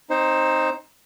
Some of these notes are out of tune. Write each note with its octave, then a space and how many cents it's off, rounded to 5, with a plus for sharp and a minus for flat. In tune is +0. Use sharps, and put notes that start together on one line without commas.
C4 -5 D#4 +0 C5 +15